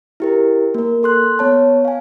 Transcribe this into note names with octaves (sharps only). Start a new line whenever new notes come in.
E4 G4 A#4
A#3 A#4
A4 C6 F#6
B3 C#5 A5
F5 G#5